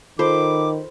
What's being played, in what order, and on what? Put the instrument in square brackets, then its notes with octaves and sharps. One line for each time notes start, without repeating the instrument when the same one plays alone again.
[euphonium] D#3 [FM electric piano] F4 A4 B5 [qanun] C5 [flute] D6